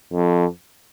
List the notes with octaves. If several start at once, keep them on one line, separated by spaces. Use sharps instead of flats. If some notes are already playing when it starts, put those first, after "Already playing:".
F2